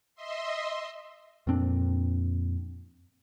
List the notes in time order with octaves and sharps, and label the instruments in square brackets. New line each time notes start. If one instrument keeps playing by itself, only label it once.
[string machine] D#5 E5 C6
[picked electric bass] F2 A#2 C4 D4